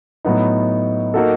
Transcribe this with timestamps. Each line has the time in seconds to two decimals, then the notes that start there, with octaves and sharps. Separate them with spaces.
0.25 A2 F#3 B3 D#4
1.14 A#3 D#4 F#4 A4